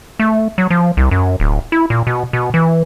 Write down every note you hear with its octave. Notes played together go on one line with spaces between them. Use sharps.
A3
F#3
F3
C2
F#2
D1
E4
A#2
B2
B2
E3